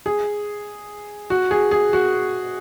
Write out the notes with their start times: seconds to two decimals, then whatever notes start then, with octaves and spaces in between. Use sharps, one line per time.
0.06 G#4
1.30 F#4
1.51 G#4
1.71 G#4
1.93 F#4